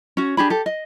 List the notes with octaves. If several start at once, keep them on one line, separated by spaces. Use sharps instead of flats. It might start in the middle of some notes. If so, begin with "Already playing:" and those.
C#4 F#4
D4 G4 G#4 B5
G4 A4
D#5